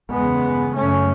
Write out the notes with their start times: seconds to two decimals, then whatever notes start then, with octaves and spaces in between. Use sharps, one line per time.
0.12 E2 C#3 G#3 B3
0.76 F#2 C#3 A3 C#4